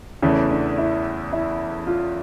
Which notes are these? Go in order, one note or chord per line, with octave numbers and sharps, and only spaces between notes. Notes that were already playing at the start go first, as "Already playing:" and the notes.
E2 C#3 E3 A3 C#4
D4
E4
E4
F4